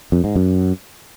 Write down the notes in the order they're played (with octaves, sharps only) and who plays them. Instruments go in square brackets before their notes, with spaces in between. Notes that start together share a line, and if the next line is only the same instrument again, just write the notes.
[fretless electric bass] F2
G#2
F#2